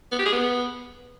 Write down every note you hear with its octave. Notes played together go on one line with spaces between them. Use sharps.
B3
G4
G#4
B3